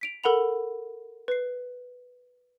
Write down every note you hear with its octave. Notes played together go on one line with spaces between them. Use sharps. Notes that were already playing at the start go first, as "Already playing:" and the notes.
B6 D7 F7
A4 A#4 F#5 B5 F7
B4 C7